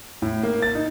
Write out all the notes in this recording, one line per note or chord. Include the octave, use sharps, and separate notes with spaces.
A2
A#3
A6
D#4